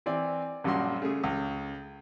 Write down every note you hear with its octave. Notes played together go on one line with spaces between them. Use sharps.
E3 C4 D5
A#1 F#2 G3 F#4 C6
C#3 A3 G#4
C#2